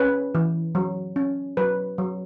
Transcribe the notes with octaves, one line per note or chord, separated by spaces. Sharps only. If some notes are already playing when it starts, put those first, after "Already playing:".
Already playing: C#4 B4
E3
F#3
C#4
F#3 B4
F#3